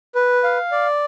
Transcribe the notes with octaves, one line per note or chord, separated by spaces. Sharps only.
B4
F5
D5